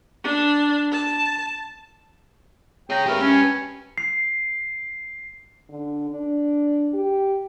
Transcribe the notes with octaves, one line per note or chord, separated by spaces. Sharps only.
D4
A5
G#4 C#5 G5 A#5
A3 C4 G4 A#4 B4
C#4
C7
D3
D4
G4